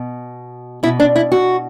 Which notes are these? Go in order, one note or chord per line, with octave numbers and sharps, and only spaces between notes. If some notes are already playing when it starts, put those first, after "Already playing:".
Already playing: B2
B2 E4
D4
E4
F#4